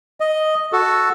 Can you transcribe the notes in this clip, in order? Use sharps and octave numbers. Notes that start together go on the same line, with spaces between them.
D#5
F#4 A4